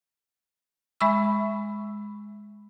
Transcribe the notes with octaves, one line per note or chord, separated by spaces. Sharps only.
G#3 E5 B5 C#6 E6